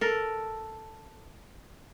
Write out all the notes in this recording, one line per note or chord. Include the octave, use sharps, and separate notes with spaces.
A4 A#4